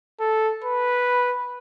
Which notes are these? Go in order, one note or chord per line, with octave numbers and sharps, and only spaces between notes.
A4
B4